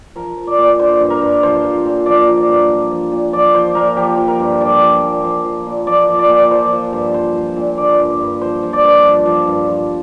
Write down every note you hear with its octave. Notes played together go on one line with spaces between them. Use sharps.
F3 A#4
F3
D5
A#2
D3 C5
G2
A#4
G2
F3 C5
F3
A#2
F3 D5
F3
D5
G2
F3
F3
A#2
F3 D5
F3 C5
A#2 A#4
F3 G4
F3
A#4
G2
F3 D5
F3
C5
A#2
F3 C5
F3
A#2
F3 D5
F3
D5
A#2
F3 C5
F3
G2
F3 C5
F3
A#2
D3 D5
G2
G2
F3 C5
F3
D5
G2
F3
F3
G2
F3